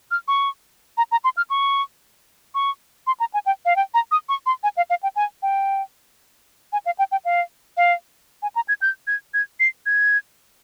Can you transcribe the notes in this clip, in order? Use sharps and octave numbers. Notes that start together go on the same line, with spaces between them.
F6
C#6
A#5
A#5
C6
F6
C#6
C#6
C6
A#5
G#5
G5
F5
G5
A#5
D#6
C#6
C6
G#5
F5
F5
G5
G#5
G5
G#5
F5
G5
G5
F5
F5
G#5
A#5
G#6
G6
G#6
G#6
C7
G#6